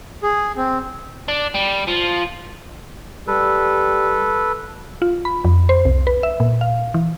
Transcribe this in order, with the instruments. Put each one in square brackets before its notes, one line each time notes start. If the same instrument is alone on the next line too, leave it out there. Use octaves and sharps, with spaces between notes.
[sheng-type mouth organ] G#4
C4
[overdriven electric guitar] D4
G3
F3
[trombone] G3 [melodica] A4 B4
[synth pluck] F4
B5
F2
C5
C2
B4
E5
A#2
F5
E3